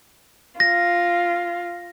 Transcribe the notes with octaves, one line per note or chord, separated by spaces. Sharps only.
F4 A#6